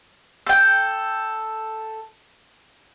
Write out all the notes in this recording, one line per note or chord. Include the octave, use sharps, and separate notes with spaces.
A4 G5